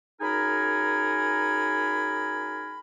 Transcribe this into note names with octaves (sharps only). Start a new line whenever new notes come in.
F#2 D#4 G#4 A#4 G#5 B5